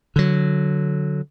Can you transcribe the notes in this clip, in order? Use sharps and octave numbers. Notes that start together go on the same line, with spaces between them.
D3 F#3